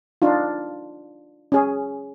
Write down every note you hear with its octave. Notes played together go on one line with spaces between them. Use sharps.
D4 D#4 F4
C#4 G#4